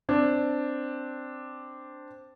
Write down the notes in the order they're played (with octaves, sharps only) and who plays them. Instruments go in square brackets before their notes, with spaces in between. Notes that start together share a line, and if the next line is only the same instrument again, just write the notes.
[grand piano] C4 D4